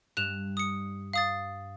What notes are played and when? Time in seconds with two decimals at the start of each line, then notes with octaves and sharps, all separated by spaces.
0.17 G2 F#6 E7 F7
0.57 D#6 C#7
1.13 F5 D#6 A6